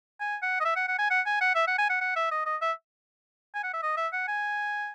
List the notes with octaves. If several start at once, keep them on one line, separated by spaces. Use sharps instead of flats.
G#5
F#5
D#5
E5
F#5
F#5
G#5
F#5
G#5
F#5
E5
F#5
G#5
F#5
F#5
E5
D#5
D#5
E5
G#5
F#5
E5
D#5
E5
F#5
G#5